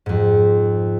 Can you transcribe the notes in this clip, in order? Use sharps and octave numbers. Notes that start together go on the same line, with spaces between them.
F2 G#2